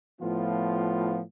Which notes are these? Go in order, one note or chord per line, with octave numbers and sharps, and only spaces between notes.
A2 F3 B3 F4